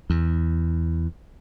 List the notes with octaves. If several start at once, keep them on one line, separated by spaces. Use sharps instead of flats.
E2